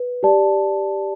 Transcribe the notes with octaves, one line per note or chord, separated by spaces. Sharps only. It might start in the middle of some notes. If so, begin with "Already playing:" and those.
Already playing: B4
G4 D5 A5